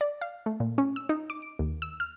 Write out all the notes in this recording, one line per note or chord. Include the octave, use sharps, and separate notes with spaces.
D5
F5
A3
A#2
C#4
E6
D#4
D6
D7
D#2
E6
F6